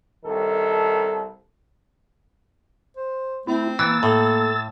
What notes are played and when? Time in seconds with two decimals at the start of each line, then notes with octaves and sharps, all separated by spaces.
0.24 C2 D#3 A4 A#4
2.97 C5
3.47 A3 C4 E4
3.79 E3 A#3 E6 A6
4.03 A2 A4